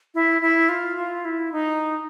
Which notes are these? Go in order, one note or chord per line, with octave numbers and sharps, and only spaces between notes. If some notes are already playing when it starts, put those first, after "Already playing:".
E4
E4
F4
F4
E4
D#4